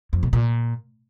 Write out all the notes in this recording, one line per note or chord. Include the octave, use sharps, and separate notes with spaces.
F2
B2
A#2